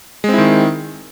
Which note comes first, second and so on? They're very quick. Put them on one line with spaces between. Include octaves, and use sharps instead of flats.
G#3 C4 E4 D#3